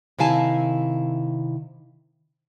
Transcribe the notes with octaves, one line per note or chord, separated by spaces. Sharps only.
C3 D#3 E4 F5 G#5 A5